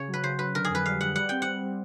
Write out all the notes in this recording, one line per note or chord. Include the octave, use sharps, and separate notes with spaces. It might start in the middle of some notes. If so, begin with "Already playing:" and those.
Already playing: C#3 C#5
F#3
B4
C#3 C5
F#3 B4
D3 A#4
F2 G#4
B4
G3 F5
G3 F#5
G3 F#5
C4 G5
F#5
G3
G3